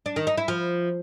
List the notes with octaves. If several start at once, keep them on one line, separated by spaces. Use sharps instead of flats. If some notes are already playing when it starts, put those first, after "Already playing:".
D4
D#3
D#4
E4
F3